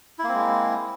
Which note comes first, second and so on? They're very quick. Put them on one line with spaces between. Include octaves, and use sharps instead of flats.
E4 A#3 C4 G#3